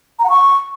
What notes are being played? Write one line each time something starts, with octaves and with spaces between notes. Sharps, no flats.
A#5
F#5
C#6